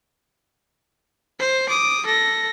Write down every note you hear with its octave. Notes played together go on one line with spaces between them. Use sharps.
C5
D6 D#6
A4 A#6